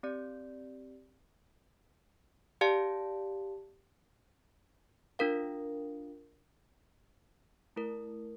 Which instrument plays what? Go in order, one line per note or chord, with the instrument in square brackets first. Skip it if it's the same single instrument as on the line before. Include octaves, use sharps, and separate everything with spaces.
[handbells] C4 G4 D5
G4 D5 F5 A5
D4 F4 A#4 F5
A3 E4 A#4